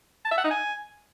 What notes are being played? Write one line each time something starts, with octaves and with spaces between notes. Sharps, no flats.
A5
E5
F#5
D#4
G#5